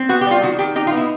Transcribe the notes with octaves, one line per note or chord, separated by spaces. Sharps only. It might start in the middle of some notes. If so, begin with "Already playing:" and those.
Already playing: C4
B3 F#4
G4
G3 F4
D#3 F#4
D#3 G4
D#4 G4
F4
B3
E4